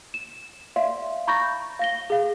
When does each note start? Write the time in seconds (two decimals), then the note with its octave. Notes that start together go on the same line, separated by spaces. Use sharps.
0.14 E7
0.76 D5 E5 F5 C6
1.27 A#5 B5 C#6 G6 A6 A#6
1.79 F5 A#6 G7
2.10 G#4 F5